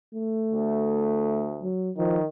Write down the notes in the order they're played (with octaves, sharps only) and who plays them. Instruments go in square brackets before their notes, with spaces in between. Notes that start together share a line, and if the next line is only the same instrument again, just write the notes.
[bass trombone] A3
[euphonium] D2
[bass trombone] F#3
[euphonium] D#3 [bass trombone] F3